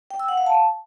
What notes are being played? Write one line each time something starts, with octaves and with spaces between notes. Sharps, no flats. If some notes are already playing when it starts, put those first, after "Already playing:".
G5
E6
F#5
F5
A5